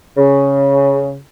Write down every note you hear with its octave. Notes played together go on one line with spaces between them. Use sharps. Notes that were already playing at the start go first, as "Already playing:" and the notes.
C#3